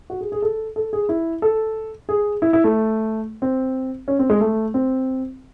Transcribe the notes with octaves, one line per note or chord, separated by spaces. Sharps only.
F#4
G#4
G#4
A4
A4
G#4
E4
A4
G#4
E4
E4
A3
C4
C#4
C4
G#3
A3
C4